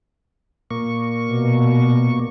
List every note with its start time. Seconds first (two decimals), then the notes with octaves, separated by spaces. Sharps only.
0.71 A#2 A#3 C#6
1.29 B2